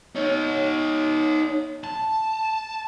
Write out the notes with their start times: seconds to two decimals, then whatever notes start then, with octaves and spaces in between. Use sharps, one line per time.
0.15 D#4 C#5
1.84 A5